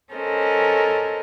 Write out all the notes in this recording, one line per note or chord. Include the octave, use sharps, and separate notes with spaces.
C#4 A4 A#4 C5 D#5